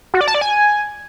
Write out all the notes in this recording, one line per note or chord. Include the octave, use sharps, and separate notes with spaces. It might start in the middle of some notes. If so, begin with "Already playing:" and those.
F#4
D5
A5
D5
G#5